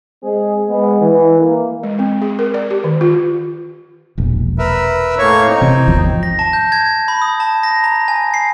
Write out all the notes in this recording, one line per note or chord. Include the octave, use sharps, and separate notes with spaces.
G#3 C4 G#4
G#3 B3
E3
A#3
G#3
C4
G#4
A#4
D5
G4
D#3
F4
E1 A#1
A#4 B4 E5
A2 A#3 C#5
C4 D#4
C3 E3
G#1 E2 F3
A#6
A5
G6
G#6
B5
D#6
A5
A#6
A#5
G#5
C7